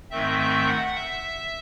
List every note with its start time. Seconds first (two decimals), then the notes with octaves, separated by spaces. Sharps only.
0.11 G#2 D#3 A3 C4 E5
0.39 E5
0.67 F#5
0.95 E5